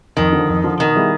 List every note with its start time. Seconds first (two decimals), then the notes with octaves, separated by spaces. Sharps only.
0.17 F2 D#3
0.33 D3 F3
0.48 F2
0.64 D3 F3
0.79 B2 D#3
0.96 G3 B3 E4 G#4